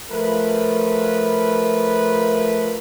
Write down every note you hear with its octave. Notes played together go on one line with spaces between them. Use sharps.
F3 A3 A#4 B4